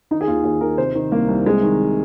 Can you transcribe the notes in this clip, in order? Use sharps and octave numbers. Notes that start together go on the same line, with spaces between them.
D#3 D#4
G#4
D#2 F4
D#2 G#4
D#3 A#4
C3 C5
D#3
C2 A#3
C2
C3 G#3
D#3